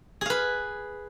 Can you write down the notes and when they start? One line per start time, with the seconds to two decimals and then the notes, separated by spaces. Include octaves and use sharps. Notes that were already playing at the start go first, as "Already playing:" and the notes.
0.21 G#4
0.26 F5
0.30 B4